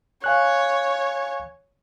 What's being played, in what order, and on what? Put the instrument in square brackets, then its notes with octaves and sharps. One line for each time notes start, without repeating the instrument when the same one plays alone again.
[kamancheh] C#5 [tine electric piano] F5 G#5 F#6